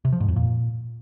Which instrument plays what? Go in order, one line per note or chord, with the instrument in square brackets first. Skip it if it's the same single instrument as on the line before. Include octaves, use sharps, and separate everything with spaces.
[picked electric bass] C3
F3
G#2
F2
A#2